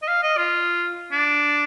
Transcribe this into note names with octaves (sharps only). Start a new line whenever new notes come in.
D#5
F5
D#5
F4
D4